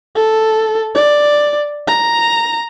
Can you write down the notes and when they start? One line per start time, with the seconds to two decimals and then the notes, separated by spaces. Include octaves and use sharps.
0.15 A4
0.95 D5
1.88 A#5